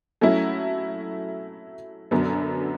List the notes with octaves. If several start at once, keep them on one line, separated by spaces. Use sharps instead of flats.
F#3 A3 C#4 E4
F#2 D3 F#3 B3